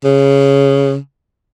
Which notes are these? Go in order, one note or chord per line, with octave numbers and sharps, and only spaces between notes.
C#3